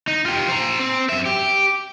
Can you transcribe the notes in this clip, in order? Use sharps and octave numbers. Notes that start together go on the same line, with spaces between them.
D#4
F4 G4
C5 A#5
C4
F#2 E5
G4